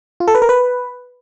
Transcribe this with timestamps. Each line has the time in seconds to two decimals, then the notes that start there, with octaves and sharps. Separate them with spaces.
0.20 F4
0.28 A4
0.35 B4
0.42 A#4
0.49 B4